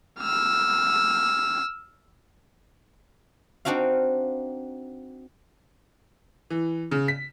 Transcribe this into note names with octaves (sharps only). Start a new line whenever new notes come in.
E6 F6
C4 D4 D#4 F#4 F5
E3
C#3
B6